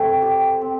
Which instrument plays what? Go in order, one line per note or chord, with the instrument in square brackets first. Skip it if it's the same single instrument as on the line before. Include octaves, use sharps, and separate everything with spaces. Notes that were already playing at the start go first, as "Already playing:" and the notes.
Already playing: [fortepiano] A3 [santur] C4
[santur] G4 D5
C4